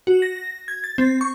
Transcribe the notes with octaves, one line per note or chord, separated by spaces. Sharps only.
F#4
A#6
G#6
A6
C4
C#6